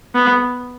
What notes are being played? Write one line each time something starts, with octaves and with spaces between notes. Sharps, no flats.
B3